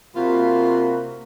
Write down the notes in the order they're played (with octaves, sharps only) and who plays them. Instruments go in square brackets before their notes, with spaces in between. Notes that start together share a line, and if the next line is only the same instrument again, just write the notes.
[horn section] C3 A#3 F4 F#4 B5